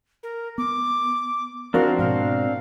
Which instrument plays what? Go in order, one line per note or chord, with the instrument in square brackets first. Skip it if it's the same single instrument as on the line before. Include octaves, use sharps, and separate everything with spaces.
[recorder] A#4
[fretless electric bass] B3 [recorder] D6
[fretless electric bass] F3 [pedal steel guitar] C4 D4 [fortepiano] F#4 A#4 [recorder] F5
[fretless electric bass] G#2 B2 [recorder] F5